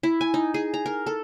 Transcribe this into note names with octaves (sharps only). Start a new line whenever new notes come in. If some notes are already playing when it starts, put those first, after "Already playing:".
E4
G#5
D#4
G#4
A#5
A#4
A4